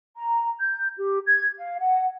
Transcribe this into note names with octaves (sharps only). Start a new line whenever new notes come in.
A#5
G6
G4
G#6
F5
F#5